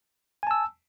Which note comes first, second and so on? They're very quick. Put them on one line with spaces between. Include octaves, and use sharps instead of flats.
G#5 A5 E6